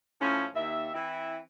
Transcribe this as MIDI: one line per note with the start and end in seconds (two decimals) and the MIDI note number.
0.20 0.44 45
0.20 0.44 53
0.20 0.44 61
0.54 0.89 39
0.54 0.89 76
0.94 1.36 52
0.94 1.36 60
0.94 1.36 64